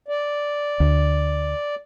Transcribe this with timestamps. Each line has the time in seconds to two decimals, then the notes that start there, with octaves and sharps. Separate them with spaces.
0.08 D5
0.80 D2